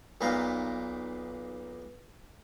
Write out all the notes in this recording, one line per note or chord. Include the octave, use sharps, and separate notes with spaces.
B1 A#2 B3 D#4 F5